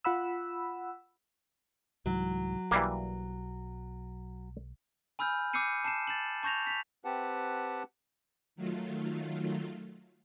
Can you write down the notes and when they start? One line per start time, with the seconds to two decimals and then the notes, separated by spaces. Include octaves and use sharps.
0.05 F4 F#5 B5 E6
2.06 C2 G#2 E3 F#3
2.71 B1 E3 G3 A#3
5.19 G#5 B5 E6 F6 G6
5.53 D6 E6 G6 C7 C#7 D#7
5.84 A5 C7 E7
6.07 A6 E7 F#7
6.43 A5 C#6 G6 A#6 F7
6.67 B6 F7
7.05 C4 G4 B4 F#5 A5
8.56 D#3 F#3 A3 F4